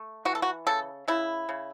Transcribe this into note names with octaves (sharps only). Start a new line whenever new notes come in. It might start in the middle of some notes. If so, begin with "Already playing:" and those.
Already playing: A3
E3 F#4
A4
F#4
C#3 A4
C#3 E4
C#3